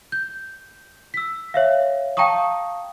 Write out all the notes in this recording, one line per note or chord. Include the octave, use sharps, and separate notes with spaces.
G6
E6 B6
C#5 E5 F5
F5 G5 A5 A#5 C#6 D#6